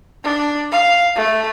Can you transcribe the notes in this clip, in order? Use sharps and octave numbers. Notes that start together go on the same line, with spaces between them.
D4
F5
A3